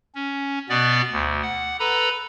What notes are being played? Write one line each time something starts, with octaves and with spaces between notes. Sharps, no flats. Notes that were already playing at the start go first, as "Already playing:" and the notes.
C#4
B2 B3 D5
D2
F#5
A4 B4 A#5 B5